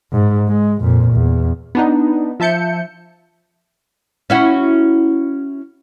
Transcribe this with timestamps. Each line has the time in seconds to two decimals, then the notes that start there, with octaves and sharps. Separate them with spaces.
0.13 G#2
0.48 G#3
0.81 F2 A#2
1.13 E2
1.75 B3 D4 D#4
2.40 F3 E5 A5 G6 C#7
4.30 C#4 E4 F#4